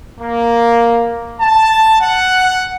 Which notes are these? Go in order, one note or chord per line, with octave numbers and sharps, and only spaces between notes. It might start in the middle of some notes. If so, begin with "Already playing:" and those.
A#3
A5
F#5